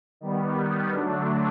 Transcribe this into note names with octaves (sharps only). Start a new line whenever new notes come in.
D#3 G3 B3
D3 F#3 A3 D4